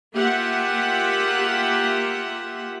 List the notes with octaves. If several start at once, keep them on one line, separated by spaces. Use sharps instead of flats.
A#3 F4 G4 E5 F#5